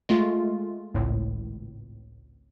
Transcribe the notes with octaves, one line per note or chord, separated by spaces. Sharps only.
G#3 A3 F4
G#1 C#2 A2